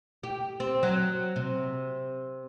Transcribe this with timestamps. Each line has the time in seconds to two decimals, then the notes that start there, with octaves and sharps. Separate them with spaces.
0.23 G4
0.60 C4
0.83 F#3
1.36 C3